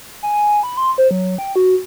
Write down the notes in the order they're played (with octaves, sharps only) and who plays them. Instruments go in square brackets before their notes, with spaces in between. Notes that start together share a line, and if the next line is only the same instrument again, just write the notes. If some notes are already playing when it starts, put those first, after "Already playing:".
[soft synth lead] G#5
B5
C6
C5
F#3
G5
F#4